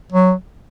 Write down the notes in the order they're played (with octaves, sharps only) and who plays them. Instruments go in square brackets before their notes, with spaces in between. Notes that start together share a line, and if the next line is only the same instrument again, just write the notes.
[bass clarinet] F#3